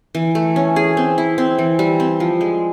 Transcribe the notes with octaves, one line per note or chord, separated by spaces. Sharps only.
E3
A3
C#4
G#4
C4
E4
C4
E3
G3
C4
F3
G#3